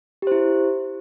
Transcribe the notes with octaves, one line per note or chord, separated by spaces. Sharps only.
E4 G4 C5